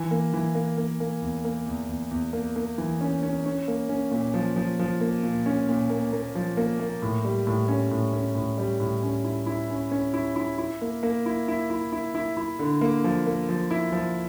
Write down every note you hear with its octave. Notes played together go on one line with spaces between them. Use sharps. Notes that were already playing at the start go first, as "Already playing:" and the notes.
Already playing: E3
A#3
E3
A#3
A#3
A#3
E2
A#3
E2
E2
E2
A#3
A#3
E3
C#4
C#4
C#4
A#3
C#4
A#2
F3
F3
F3
A#3
A#2
C#4
A#2
A#3
A#3
F3
A#3
A#3
A2
G3
A2
C#4
A2
C#4
A2
G3
A2
C#4
E4
E4
C#4
C#4
E4
E4
E4
A#3
A#3
E4
E4
E4
E4
E4
E4
D3
A#3
F3
A#3
F3
E4
F3